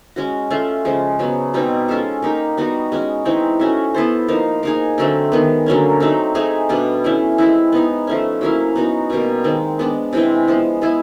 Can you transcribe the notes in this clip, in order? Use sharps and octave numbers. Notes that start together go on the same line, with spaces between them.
G#3 C#4 F#4
A3 C#4 F4
C#3 F3 G#3
C#3 F#3 B3
B2 G3 C4 D#4
G#3 C#4 F4 A4
A#3 D#4 G4
G3 B3 D#4 F#4
G#3 C#4 F#4
E3 G#3 C4 D#4
A3 C#4 F#4
B3 E4 A4 C5
F3 A#3 D#4
A#3 D#4 G#4
D3 F#3 A3 C4
D#3 G#3 B3
D3 F#3 A#3 C#4
F#3 A3 C4 D#4
A3 C4 D#4 G#4
B2 G3 B3 D4
E3 A3 C#4
G#3 C4 E4
B3 D#4 G#4
F3 A3 C#4
F#3 A#3 C#4 E4
B3 D#4 F#4
B2 G3 A#3
D#3 G#3 C4
G#3 B3 D4
C3 E3 G#3 C4
F3 G#3 B3
G#3 B3 E4 G#4